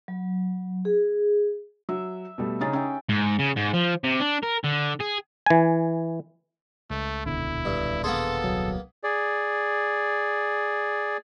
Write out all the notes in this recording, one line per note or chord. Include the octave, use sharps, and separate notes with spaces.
F#3
G#4
F#3 E5
B2 G3 A3
C#3 C#4 D#4 G#4 A6
C#4 E5 G5
G#2
C#3
G#2
F3
C3
D4
A#4
D3
G#4
E3 G#5
C#2 A3
D#1 B2 D3 E4
G2
A#3 B3 G#4 A4 C6
C2 F#3
G#4 D5